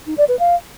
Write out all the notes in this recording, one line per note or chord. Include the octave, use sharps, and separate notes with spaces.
D#4
D5
B4
F5